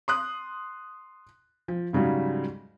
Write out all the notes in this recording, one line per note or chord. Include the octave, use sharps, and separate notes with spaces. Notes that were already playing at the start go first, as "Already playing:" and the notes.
C6 D#6 F#6
F3
G#2 C#3 F#3 G3